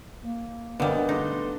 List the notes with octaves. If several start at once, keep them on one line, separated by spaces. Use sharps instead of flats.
A#3
B1 D3 G3 B3 A#4 F5
A3 D4 D#4 C6